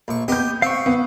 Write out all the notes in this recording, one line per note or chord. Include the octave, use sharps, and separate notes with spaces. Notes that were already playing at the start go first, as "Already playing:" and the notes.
A#1 C#6
B3 G4 D#5 G6
C4 F5 C#6
B3